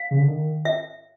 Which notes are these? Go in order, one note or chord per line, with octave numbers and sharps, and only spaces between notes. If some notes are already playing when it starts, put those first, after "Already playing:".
Already playing: F5
C#3
D3
D#3
E5